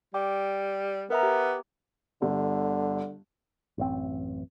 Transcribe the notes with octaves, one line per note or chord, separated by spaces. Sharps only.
G3 G5 D6
B3 A#4 E5 A#5
G4
G1 D3
A1 F#2 C4